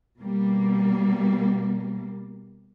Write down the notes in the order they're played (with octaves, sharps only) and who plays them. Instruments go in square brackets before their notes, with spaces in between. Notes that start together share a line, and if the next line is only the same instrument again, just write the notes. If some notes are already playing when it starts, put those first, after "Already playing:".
[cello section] B2 G3 A#3